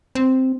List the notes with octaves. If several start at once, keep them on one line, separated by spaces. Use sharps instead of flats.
C4